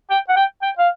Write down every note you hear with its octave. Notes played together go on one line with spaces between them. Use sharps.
G5
F#5
G5
G5
F5